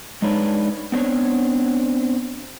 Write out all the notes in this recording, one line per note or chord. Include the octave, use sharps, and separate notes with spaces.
G#3 D4 D#4 B4 C#5 D5
B3 C4 D4 C#5